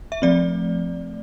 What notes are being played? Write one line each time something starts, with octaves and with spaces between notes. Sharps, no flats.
E5
F3 A3 C4 D5